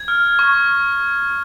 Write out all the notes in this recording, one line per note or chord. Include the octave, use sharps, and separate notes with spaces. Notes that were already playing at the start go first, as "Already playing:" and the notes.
Already playing: G#6
F6
C#6